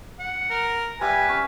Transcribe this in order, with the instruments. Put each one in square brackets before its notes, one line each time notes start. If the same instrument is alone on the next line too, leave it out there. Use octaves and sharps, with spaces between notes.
[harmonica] F#5
[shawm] A#4
[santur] G3 E5 [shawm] B4 [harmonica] G#5
[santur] C#4